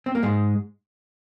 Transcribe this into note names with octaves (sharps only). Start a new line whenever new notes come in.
C4
A#3
G#2 G#3